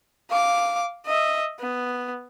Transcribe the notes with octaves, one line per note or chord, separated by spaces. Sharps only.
F5 D6
D#5 E5
B3